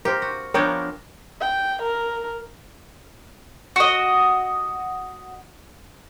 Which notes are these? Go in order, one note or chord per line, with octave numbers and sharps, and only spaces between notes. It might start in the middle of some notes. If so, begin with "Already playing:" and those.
G4 A#4 C5
F#4
F3 B3 D4 A#4 C#5 G5
G5
A#4
F#4 D#5